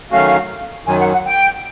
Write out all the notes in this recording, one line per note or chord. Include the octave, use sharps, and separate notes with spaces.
D#3 F#3 A3 C#4 F#4 F5
F#2 D#3 F#3 G#5
F#5
F#5
G5